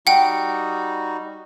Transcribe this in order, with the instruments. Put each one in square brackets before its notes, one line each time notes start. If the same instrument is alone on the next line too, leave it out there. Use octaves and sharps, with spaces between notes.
[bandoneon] G3 D#4 F#4 [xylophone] F#5 G5